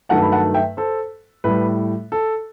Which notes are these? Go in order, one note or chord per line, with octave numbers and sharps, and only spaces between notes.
G2 D#3 F#3 A3 F#5 A5
B5
F#5 A5
E5 G5
A4 C5
A2 G3 B4
A4